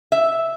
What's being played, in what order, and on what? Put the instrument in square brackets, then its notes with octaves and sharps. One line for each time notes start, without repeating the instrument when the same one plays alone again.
[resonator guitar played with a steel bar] E5